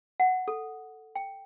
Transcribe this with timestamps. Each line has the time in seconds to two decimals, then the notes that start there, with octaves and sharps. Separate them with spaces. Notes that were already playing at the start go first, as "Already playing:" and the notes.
0.20 F#5
0.48 A4
1.15 G5